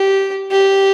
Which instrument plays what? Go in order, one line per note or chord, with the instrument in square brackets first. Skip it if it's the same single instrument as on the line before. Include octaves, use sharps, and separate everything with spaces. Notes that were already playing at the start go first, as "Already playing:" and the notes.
Already playing: [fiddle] G4
G4